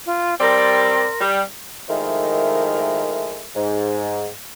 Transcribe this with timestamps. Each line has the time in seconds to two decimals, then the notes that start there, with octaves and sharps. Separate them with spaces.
0.06 F4
0.40 G3 C4 A#4 D5 C6
1.20 G3
1.88 D#3 F3 G#3 A3 E4 A#4
3.55 G#2